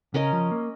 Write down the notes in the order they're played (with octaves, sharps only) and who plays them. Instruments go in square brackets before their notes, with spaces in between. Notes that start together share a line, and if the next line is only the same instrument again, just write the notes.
[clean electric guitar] C#3 [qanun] C#4 A#4 D#5
[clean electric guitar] F3
A#3